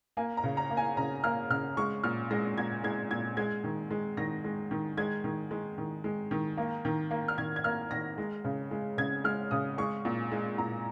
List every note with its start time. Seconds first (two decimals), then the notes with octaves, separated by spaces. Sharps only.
0.17 A#3 G#5
0.37 A#5
0.44 C#3
0.57 A#5
0.70 A#3
0.77 G#5
0.97 C#3 A#5
1.24 A#3 F6
1.50 C#3 F6
1.77 G#3 C#6
2.04 A#2 F6
2.31 G#3 A#6
2.57 A#2 G#6
2.84 G#3 G#6
3.11 A#2 G#6
3.37 G#3 G#6
3.64 D#3
3.91 G#3
4.17 D#3 A#6
4.45 G#3
4.71 D#3
4.97 G#3 G#6
5.24 D#3
5.51 G#3
5.78 D#3
6.04 G#3
6.31 D#3
6.57 A#3
6.85 D#3
7.11 A#3
7.28 F6
7.38 D#3 G#6
7.56 G#6
7.64 A#3 F6
7.91 D#3 A#6
8.18 G#3
8.44 C#3
8.71 G#3
8.98 C#3 G#6
9.24 G#3 F6
9.51 C#3 D#6
9.78 G#3 C#6
10.05 A#2
10.32 G#3
10.58 A#2 A#5